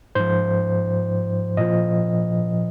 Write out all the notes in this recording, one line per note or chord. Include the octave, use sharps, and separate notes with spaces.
G#2 F3 C5
A#2 F3 D#5